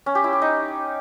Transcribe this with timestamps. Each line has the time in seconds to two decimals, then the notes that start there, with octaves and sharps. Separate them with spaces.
0.06 C#4
0.15 G4
0.24 E4
0.33 G4
0.42 D#4